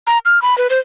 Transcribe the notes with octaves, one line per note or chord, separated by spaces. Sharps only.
A#5
F6
B5
B4
C5